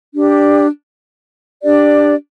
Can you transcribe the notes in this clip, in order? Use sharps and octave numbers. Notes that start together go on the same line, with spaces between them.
D4 G4 D5
D4 G4 D5